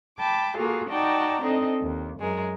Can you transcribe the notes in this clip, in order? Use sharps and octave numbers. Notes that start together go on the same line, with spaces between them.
G5 A5 B5 D6
A#3 F4 F#4 G#4 A4
D#4 F#4 D5 G5 A5 A#5
C4 D4 D#4 A4 D#5
D#2
F#2 G#3 A#4